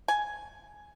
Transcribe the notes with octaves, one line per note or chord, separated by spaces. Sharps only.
G#5